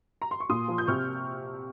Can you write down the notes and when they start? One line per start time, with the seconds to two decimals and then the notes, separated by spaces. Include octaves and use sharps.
0.22 A#5
0.31 C6
0.40 C#6
0.50 A#2 C6 D#6
0.68 F3
0.78 G6
0.87 C3 C#6 F6